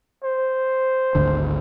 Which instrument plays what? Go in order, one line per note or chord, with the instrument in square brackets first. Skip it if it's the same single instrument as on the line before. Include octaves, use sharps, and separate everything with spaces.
[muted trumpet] C5
[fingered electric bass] G#1 D2 D3